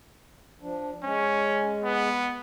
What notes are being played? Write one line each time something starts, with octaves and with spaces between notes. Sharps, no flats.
F3 D4
G#3 C#4
B3